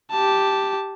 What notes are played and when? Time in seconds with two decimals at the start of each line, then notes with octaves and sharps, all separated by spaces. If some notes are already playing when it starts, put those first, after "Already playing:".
0.11 G4 A5